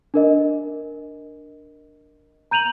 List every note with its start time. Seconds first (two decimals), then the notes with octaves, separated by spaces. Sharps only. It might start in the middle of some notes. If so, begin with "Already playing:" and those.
0.14 D4 A#4 D#5
2.51 A#5 G6 D#7 F7 F#7